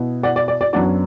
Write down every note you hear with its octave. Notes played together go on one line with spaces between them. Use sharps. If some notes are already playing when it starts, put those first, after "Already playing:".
Already playing: B2 B3 E4
D5 F#5
D5
D5
D5
F#2 F#3 B3 D4 D5 F#5